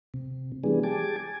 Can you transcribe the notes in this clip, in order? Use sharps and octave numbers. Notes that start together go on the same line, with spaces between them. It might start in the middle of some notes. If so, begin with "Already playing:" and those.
C3
E3 G3 G#3 B3 D4 G#4
G4 G#4 G#5 A5 D6
G#5